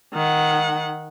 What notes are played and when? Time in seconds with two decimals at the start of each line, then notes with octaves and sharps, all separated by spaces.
0.14 D#3 F#5